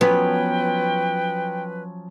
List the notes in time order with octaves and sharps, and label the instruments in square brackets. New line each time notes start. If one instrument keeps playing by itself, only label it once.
[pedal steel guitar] F3 F#3 C#4 [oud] B3 [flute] B4 [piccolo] G5